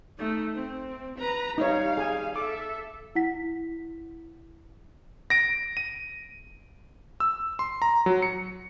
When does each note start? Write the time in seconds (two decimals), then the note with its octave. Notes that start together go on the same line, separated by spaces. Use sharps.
0.18 A3 D#4
0.55 C4
1.19 B4 A#5
1.58 G3 D#4 C#5 F5
1.97 G#4 G#5
2.36 A4 E5 D6
3.15 E4 F#5 B6
5.30 A#6 D7
5.77 D#7
7.20 E6
7.59 C6
7.82 A#5
8.06 F#3
8.22 C#7